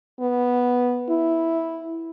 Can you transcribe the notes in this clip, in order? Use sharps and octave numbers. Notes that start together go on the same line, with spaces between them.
B3
E4